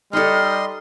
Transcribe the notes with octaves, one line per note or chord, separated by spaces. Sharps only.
G3 D#4 A4 D#5 C6 F6